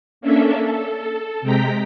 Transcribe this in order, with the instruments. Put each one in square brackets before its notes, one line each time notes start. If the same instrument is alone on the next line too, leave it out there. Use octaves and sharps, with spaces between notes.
[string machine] A#3 C#4 D4 A4 E5
A4
C3 G#3 G5 A#5 B6